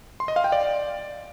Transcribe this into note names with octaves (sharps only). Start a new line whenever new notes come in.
C6
D#5
F5
G5
D5